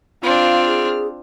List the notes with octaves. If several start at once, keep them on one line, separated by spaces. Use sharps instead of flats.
C4 D4 F4 F5 F6
G#4